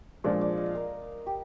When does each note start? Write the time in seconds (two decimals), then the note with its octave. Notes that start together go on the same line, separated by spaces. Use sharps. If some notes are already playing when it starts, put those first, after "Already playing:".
0.24 A#2 F3 G#3 D4 D5
0.41 D5
0.57 D#5
0.66 F5
0.75 A#4
1.26 G4